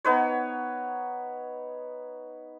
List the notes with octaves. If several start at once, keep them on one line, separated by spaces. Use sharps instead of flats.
B3 D#4 B4 C#5